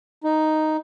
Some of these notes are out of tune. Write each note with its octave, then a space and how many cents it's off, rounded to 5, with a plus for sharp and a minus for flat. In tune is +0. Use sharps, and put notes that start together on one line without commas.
D#4 +0